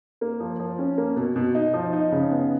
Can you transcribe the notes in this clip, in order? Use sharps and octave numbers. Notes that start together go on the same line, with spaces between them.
A#3
F3
F3
C#4
A#3
B2
B2
D#4
F3
D#4
C#3
B3